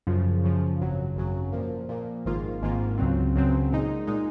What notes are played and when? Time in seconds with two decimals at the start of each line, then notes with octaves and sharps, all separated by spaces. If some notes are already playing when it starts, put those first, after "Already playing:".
0.07 F#2 C#3 F3
0.44 F#2 C#3 F3
0.80 G#1 F#2 C#3 F#3
1.16 G#1 F#2 C#3 F#3
1.52 A#2 F3 A#3
1.89 A#2 F3 A#3
2.25 G#1 G#2 D#3 A#3 F4
2.61 G#1 G#2 D#3 A#3 F4
2.98 C#2 C#3 F#3 C4
3.35 C#2 C#3 F#3 C4
3.72 A#2 G#3 D#4
4.07 A#2 G#3 D#4